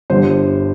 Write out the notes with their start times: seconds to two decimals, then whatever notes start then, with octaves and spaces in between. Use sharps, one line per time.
0.10 G1 G2 D3 C5